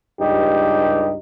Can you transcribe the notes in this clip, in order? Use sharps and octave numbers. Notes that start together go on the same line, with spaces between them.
C#2 G2 D#4 G4